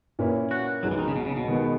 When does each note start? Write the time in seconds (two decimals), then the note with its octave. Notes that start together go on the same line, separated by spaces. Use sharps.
0.19 A#2 A#3 C#4 E4 B4
0.51 F#4
0.83 B1 B2 F#3 G#3 B3
0.91 E3
0.99 D#3
1.08 C#3
1.16 B2
1.26 C#3
1.37 B2
1.47 D#3 G#3 B3